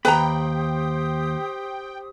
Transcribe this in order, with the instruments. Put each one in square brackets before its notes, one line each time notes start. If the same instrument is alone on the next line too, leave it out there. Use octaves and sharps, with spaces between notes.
[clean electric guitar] D#2 B5 [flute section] G4 C5 D#6 [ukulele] B4 A#5 [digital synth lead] G5